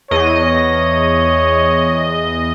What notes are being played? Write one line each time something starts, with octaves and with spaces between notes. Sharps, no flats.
E2 C#5 D#5